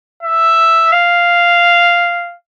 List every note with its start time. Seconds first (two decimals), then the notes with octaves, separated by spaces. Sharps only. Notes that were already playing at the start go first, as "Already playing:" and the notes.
0.23 E5
0.92 F5